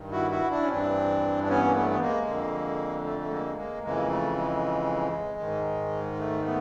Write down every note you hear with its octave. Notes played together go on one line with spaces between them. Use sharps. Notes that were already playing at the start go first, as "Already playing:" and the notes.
Already playing: G2 D#3
E4 F#4
E4 F#4
D4 E4
C#4
G2 E3 C4 D4
D4
B3 C#4
A#3
A3 B3
B3
G#3 A#3
F2 D3
A3
A3
G#3 A#3
G#3 A#3
F2 C#3 E3 G#3 A#3
A3
G#3
G#2 D#3
G#3
A3
A3 B3